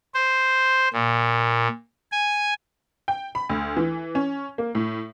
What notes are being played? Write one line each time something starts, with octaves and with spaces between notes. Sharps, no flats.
C5
A#2
G#5
G5
B5
D2
E3
C#4
A#3
A2